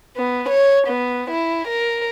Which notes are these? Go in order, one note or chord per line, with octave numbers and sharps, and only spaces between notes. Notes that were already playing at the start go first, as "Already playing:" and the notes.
B3
C#5
B3
E4
A#4